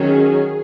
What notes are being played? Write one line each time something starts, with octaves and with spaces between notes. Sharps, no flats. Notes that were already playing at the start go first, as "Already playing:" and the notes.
Already playing: D#3 F#3 C#4 G#4